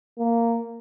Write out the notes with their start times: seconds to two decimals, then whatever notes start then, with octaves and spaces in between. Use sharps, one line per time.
0.19 A#3